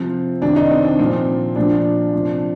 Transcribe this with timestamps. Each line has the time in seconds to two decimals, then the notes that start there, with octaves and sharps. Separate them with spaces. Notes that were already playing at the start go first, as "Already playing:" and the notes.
Already playing: C3 F3 C4
0.41 C3 D#3 D4
0.56 D#4
0.71 C4
0.84 D4
0.99 A#2 F3 C4
1.56 A#2 F3 D4
2.13 C3 F3